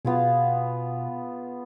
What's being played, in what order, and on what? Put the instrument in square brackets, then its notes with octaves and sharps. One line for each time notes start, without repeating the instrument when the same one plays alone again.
[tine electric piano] B2 [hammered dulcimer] B3 F4 G#4